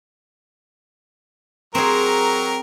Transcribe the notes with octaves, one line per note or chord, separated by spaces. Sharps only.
F#3 C4 G#4 A#4 A#5